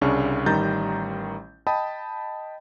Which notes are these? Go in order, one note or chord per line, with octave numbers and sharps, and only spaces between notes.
C2 C#3 C#4 D4 C#6
A1 D#3 G3 A#5 G6 A6
D#5 G5 A5 B5 D#6